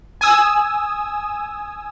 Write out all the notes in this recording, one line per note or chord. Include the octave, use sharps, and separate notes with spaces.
G#5 D#6 E6